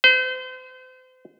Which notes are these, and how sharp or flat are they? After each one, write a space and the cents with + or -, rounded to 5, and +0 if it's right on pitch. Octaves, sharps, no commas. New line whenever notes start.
C5 -35